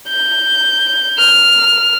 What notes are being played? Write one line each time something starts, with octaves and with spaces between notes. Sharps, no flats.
G6
F6